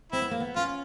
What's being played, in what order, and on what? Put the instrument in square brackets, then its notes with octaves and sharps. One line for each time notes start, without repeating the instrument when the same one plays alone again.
[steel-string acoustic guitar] C4 [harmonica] E4
[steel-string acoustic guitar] B3
A#3
B3
[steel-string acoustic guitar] C#4 [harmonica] F4